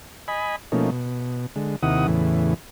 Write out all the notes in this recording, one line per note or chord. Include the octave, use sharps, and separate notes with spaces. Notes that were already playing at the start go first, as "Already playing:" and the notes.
D#5 G#5 B5
B2 F3 A3 A#3 C#4 D#4
B2
D3 G#3
D#2 C3 D#3 E4 F#5 D#6
E2 A2 C#3 E3